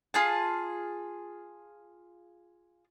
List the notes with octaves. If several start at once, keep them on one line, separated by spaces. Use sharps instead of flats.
F4 G#4 A5